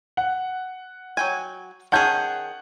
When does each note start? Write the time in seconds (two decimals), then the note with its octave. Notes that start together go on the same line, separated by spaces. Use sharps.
0.17 F#5
1.17 F#3 G5 G#5
1.92 D#3 C#4 G#4 F#5 A5 G6